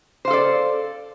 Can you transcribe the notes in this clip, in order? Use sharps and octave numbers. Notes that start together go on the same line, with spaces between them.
A4 C5 D5 F5